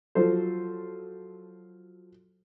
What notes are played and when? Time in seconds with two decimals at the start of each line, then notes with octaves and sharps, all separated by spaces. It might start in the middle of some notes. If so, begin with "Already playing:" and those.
0.15 F3 F#3 A4 C5